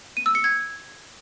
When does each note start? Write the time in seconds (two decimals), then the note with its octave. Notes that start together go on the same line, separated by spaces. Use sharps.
0.17 D#7
0.26 E6
0.35 C#7
0.44 G#6